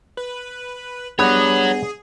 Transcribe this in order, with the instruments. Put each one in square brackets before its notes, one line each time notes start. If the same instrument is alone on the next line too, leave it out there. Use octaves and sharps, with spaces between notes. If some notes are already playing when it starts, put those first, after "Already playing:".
[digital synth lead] B4
[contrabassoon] G2 [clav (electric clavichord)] B3 B4 D5 [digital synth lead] G#4 [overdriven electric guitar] C#5 F#5